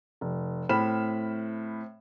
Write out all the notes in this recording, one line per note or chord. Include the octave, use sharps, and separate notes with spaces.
F1
A2 C4 B5 F6 E7